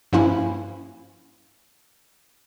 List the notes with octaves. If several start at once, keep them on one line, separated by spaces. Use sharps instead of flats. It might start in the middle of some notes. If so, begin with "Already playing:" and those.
G2 F3 A#3 C#4 E4